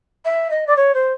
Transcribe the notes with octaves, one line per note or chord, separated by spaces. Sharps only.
E5
D#5
D5
C#5
C5